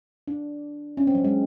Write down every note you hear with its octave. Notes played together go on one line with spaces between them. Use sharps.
D4
C#4
C4
F#3
G#3